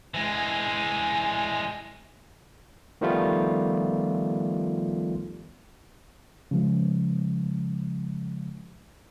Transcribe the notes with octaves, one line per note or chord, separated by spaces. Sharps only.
E3 G#3
D#3 F3 G3 A3 B3 F4
C#3 F3 G#3